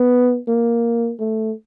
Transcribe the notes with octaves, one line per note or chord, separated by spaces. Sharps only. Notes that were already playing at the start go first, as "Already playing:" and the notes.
Already playing: B3
A#3
A3